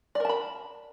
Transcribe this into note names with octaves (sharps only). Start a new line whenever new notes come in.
A#4 D5 A5 B5